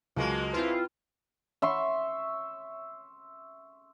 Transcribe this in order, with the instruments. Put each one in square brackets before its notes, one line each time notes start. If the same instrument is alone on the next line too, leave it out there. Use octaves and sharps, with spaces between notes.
[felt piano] C#2 F#3 [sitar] B2 G#3 A#3
[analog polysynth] C4 E4 F4 [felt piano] B4
[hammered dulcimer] E5 C6 C#6